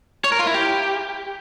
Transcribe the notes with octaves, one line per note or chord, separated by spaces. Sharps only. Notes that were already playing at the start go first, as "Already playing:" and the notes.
C#5
A#4
F4
E4
G4